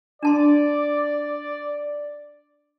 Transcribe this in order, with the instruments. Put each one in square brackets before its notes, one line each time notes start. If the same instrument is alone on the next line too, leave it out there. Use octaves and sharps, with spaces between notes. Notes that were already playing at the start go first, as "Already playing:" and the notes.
[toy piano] D4 A5 C6 [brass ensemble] D5